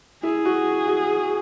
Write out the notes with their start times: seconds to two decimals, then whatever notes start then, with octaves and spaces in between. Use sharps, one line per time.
0.23 E4 G#4
0.45 F#4
0.87 F#4